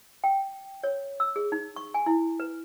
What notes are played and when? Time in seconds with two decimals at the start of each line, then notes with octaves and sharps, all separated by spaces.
0.24 G5
0.83 C#5
1.20 E6
1.36 G#4
1.52 D#4
1.76 C#6
1.94 G#5
2.06 E4
2.40 B4